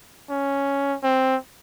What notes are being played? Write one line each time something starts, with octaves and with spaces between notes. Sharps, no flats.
C#4
C4